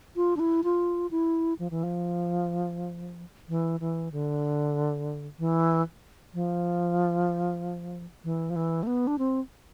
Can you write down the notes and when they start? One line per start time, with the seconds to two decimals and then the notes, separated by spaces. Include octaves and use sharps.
0.16 F4
0.37 D4
0.40 E4
0.64 F4
1.11 E4
1.59 F3
1.71 E3
1.83 F3
3.49 E3
3.80 E3
4.12 D3
5.39 E3
6.34 F3
8.24 E3
8.50 F3
8.56 E3
8.83 A3
8.87 B3
9.07 D4
9.19 C4